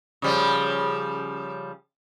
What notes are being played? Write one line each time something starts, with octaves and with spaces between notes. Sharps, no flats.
C#3 F3 G3